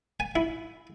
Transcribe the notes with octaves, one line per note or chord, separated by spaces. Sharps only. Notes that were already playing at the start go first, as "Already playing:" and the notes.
G#5
E4